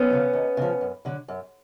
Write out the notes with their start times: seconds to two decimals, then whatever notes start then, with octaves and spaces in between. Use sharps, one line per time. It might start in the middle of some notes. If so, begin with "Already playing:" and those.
Already playing: B3 C#4
0.10 C#3 F3
0.33 D#2
0.57 C#3 F3
0.81 F#2
1.05 D3 F#3
1.28 F#2